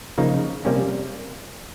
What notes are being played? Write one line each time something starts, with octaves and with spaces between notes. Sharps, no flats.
C#3 F3 A#3 D#4
C3 G3 A#3 C#4